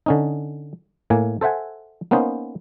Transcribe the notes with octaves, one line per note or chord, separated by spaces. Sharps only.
D3 C#4 D#4
A2 A#3 G#5
A4 C5 E5 F#5 G#5
A#3 B3 C#4 D#4 C5